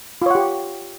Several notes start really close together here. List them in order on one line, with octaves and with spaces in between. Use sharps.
F4 C#5 F#5 G4